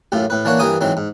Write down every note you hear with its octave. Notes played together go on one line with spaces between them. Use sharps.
A1 F#2 A2 F4
A2 B4
E3 A#3 D4 C#5 F#5
G2 E3 A#4 G5 G#5 D#6
G#2 E3 F#3 C4
G#2